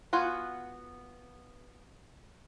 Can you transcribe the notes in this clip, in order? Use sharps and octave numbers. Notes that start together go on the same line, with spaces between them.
B3 F4 F#4 G#5